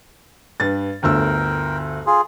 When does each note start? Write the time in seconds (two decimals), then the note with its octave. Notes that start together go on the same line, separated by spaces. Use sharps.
0.60 G2 B4 A6
1.03 G1 D2 A#4 G5 E6
2.06 F4 G#4